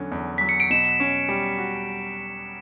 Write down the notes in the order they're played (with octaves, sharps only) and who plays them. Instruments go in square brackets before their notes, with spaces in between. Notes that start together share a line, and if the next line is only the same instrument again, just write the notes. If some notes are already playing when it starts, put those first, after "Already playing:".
Already playing: [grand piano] E2 D3 F#3 C#4
E2
[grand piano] F#3 [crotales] B6
[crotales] C#7
D7
[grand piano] B2 [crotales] E7
[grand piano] C#4
G3
F#4